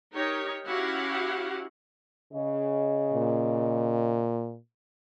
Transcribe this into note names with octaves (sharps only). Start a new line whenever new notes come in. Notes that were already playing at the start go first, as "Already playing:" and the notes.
D#4 G4 A#4 C#5
C#4 E4 F#4 G4 F5 F#5
C#3 D#5
A#2